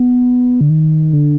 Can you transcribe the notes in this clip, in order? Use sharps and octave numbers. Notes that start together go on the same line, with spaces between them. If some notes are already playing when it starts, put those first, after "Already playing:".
Already playing: B3
D3
D#3
D3